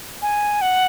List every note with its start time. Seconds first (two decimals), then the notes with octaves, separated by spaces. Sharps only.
0.22 G#5
0.61 F#5